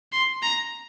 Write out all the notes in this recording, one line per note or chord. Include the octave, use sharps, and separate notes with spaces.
C6
A#5